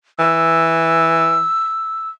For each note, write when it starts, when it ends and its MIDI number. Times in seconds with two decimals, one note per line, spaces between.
0.19 1.46 52
0.19 2.09 88